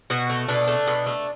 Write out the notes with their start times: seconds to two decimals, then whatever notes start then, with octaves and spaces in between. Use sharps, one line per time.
0.10 B2 F#4
0.30 A3
0.48 B2 D4
0.68 A3
0.87 B2
1.06 A3